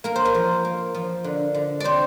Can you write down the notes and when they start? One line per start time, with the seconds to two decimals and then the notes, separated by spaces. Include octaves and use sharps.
0.04 A#3 A#4
0.16 C5
0.25 A#4
0.34 F3
0.65 A#3
0.94 F3
1.24 D3
1.54 D3
1.80 C4 C5 D5